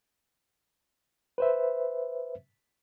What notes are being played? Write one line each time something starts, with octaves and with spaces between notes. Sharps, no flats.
B4 C5 E5